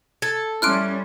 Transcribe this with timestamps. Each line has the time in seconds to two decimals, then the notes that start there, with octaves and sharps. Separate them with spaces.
0.22 A4 G#6
0.62 G3 C#4 E4 C6 D6 F6 F#6 D7